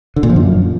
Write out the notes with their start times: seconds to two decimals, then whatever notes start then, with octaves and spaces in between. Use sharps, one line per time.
0.16 D3
0.23 A#2
0.30 F3
0.36 F#2